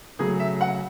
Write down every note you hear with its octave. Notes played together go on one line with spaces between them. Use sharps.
C#3 F#3 A3 G#4
E5
F#5